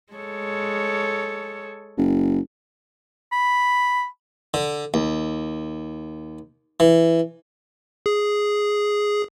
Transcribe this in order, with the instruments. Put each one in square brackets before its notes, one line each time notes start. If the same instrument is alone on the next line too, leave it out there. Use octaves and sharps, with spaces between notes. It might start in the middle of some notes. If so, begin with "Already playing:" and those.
[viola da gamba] G#3 A4 C#5
[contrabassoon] F#1
[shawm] B5
[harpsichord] D3
D#2
E3
[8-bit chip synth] G#4